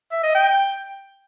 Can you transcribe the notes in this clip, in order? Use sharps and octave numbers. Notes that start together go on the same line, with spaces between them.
E5
D#5
G5